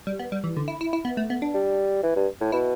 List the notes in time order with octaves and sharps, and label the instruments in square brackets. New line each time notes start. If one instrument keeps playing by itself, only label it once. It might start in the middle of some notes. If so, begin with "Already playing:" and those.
[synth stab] G3
B3
G3
E3
D3
E4
E4
E4
B3
A3
B3
D4
[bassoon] G3
E3
G2
A2
[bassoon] B2 [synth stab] E4